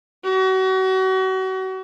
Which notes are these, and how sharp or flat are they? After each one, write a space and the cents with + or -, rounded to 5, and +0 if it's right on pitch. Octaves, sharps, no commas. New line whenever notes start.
F#4 +35